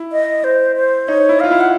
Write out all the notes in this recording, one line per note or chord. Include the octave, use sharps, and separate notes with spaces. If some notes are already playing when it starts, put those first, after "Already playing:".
Already playing: E4
D#5
C5
C5
D#4 C#5
E4
F4 F5
E4
F#5